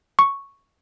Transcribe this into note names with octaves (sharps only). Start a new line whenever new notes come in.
C#6